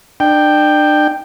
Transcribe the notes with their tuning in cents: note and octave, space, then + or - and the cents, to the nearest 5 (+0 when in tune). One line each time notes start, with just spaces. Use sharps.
D4 +35 G5 +0